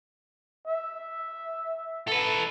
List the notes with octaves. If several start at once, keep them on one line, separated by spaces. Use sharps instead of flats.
E5
A4 B4